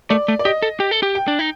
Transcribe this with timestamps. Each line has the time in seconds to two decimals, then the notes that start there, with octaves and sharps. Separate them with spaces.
0.10 A3 D5
0.28 A3
0.39 D5
0.45 G4 D#5
0.62 A4
0.80 G4
0.91 A4
1.03 G4
1.15 G5
1.28 D4
1.39 D#4